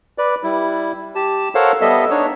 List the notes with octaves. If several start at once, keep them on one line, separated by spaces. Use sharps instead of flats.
B4 D5
G3 E4
G4 A5
A4 A#4 C5 C#5 F5 F#5
G3 B3 A4 D#5 E5
D4 D#4 C#5